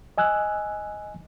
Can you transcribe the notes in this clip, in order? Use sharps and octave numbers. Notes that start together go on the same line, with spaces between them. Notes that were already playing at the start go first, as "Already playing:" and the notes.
D#5 G#5 E6 F#6